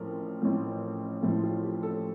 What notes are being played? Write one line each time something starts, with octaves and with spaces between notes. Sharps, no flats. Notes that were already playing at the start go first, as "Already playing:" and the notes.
Already playing: A1 A2 F3 A#4
A1 A2 F3
A1 A2 F3 E4
F4
G4
A4